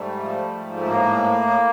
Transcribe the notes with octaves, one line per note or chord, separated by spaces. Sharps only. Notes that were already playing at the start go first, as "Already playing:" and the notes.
Already playing: G#2 G3 A3
F3
G#2
A3
A2 A#3